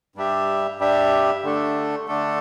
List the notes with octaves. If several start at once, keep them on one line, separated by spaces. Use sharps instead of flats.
G2 G3 D4 G4 E5
G2 G3 D4 G4 E5
D3 A3 D4 A4
D3 A3 D4 A4